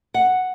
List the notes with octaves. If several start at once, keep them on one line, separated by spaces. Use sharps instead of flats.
F#5